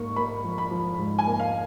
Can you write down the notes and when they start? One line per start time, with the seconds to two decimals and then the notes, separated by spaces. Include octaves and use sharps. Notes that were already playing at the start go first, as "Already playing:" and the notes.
Already playing: G#2 A#3 C#6
0.16 A#3 B5
0.44 F3
0.58 B5
0.71 F3
0.99 G#2
1.19 G#5
1.26 A#3
1.40 F5